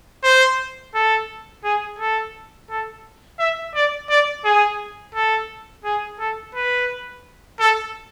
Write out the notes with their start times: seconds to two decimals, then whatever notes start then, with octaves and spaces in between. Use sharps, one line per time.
0.24 C5
0.94 A4
1.64 G#4
1.99 A4
2.70 A4
3.39 E5
3.74 D5
4.10 D5
4.45 G#4
5.15 A4
5.84 G#4
6.19 A4
6.55 B4
7.60 A4